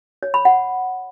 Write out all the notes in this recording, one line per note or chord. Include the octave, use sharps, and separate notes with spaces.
C#5
B5
F#5